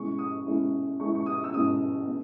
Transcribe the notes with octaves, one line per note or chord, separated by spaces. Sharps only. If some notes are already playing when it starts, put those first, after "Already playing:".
Already playing: B2 G#3 C#4 E4 C#6
D#6
B2 G#3 C#4 E4
B2 G#3 C#4 E4 C#6
C#6
D#6
E6
B2 G#3 C#4 E4 D#6
B2